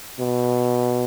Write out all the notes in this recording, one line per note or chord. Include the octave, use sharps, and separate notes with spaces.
B2